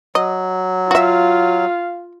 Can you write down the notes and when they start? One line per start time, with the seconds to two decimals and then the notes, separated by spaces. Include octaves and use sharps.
0.15 F#3 D#5
0.91 F4 F#4 E5 F5